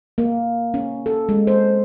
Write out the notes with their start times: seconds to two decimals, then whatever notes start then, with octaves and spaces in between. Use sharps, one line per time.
0.18 A#3
0.74 C#4
1.06 A4
1.29 G#3
1.47 C5